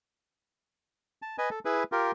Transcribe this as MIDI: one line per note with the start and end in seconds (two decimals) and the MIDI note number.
1.22 1.37 81
1.38 1.49 71
1.38 1.49 75
1.38 1.49 80
1.50 1.59 69
1.65 1.84 64
1.65 1.84 68
1.65 1.84 71
1.92 2.12 65
1.92 2.12 67
1.92 2.12 70